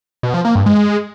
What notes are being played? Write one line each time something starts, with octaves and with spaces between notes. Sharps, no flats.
B2
F3
A#3
G2
G#3